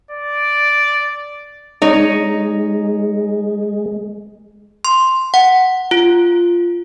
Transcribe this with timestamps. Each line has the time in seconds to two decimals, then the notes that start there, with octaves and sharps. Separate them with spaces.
0.11 D5
1.82 G#3 D#4 C#5
4.85 C6
5.34 F#5
5.91 F4